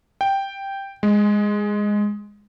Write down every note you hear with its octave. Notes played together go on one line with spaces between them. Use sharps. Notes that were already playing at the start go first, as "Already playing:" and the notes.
G5
G#3